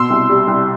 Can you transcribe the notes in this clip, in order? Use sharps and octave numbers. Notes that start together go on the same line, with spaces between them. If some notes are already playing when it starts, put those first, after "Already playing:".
Already playing: B2 C6 E6
C2
G3
C2